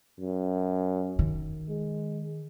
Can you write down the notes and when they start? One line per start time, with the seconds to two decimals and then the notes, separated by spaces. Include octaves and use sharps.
0.20 F#2
1.19 D#3
1.69 G#3